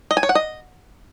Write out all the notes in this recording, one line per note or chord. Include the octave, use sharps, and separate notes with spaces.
D#5
G#5
C#5
F#5
D#5